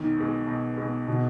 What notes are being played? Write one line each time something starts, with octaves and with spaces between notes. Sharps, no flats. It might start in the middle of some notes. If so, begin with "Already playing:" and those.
Already playing: B1 D#3
B2 G#3
B1
B2 G#3
B2